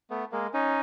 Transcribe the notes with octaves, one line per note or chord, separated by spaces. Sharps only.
A3 B3
G#3 A#3
C#4 D#4